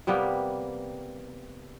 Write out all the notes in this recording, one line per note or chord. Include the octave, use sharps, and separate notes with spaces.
C3 G3 A#3 B3